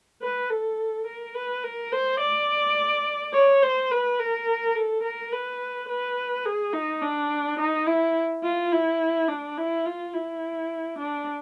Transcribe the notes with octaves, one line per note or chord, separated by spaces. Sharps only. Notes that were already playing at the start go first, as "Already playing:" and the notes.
B4
A4
A#4
B4
A#4
C5
D5
C#5
C5
B4
A#4
A4
A#4
B4
B4
G#4
D#4
D4
D#4
E4
F4
E4
D4
E4
F4
E4
D4